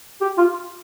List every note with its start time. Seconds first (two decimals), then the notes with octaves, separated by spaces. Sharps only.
0.21 G4
0.38 F4